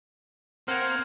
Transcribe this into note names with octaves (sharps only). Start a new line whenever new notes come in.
A#3 C4 F#5 F6 G#6